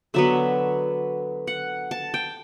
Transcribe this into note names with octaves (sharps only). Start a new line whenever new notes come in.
D3 F#3 B3 E5
F#5
A5
G5